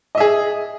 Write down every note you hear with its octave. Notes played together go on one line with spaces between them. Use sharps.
G#4 D#5 E5